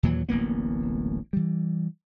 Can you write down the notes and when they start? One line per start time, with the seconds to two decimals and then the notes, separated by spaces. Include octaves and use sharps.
0.03 D#2 A#2 E3 F#3
0.29 D1 A1 A#3 B3
1.33 E3 G3